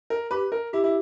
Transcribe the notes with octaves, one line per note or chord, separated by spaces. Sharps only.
A#4
G4 B4
A#4
E4 G4
E4